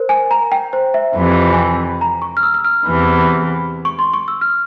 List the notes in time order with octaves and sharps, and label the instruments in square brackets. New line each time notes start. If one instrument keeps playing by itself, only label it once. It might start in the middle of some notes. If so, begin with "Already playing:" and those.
Already playing: [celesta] A#4 C5
G#5
A#5
G5
C5
E5
[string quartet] F2 C3 E3
[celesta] G#5
G5
A#5
C#6
F6
E6
E6
F6
[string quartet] E2 C3 E3
[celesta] C#6
C6
C#6
E6
F6